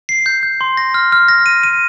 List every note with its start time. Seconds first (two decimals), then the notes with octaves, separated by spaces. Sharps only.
0.09 C7
0.26 G6
0.43 G6
0.61 C6
0.77 A#6
0.94 F6
1.12 F6
1.28 A#6
1.46 D#7
1.63 D#7